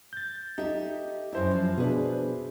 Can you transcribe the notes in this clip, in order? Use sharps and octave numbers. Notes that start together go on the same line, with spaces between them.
G6 A6
D#4 G4 A4 E5
F#2 D4 E4 C5
F3
B2 D4 G#4 B4